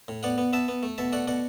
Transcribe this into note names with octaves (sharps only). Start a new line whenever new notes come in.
A2
B3 D5 F#5
B3
B3 E5 A5
B3
A3
B2 E5 A5
A3 D5 F#5
B2 D5 F#5